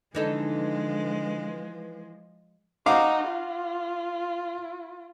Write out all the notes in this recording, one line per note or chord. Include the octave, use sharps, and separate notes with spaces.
D3 E3 F3 G#3 D#4 A4 B4
D#4 F#4 F5 D6
F4